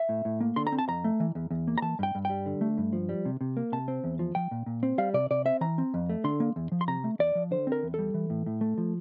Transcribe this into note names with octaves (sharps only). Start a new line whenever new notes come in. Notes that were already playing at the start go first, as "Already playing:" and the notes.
Already playing: E5
A2
A2
A#3
D3 C6
A#5
C4
A5
F2 A#5
A3
E3
E2
E2
A#3
A#5
E3 A5
G2 G5
G2
G3 G5
D3
A3
G2
F3
G3
C3
C3
A#3
C3 A5
C4
E2
F3
F3 G5
A#2
A#2
C4
G3 F5
C3 D5
C3 D5
C4 E5
E3 A#5
C4
F2
A3
D3 C6
A#3
E2
F3
C6
C3 A#5
A3
E2 D5
F3
D3 C5
C4 A#4
E2
G3 A4
E3
A2
A2
A3
F3